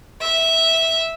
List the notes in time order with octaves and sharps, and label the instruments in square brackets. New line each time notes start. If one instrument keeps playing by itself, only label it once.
[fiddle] E5